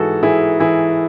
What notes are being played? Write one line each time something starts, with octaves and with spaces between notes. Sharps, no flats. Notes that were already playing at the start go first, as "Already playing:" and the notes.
Already playing: G#2 E3 F#4 G#4 A4
E3 E4 G#4
E3 E4 G#4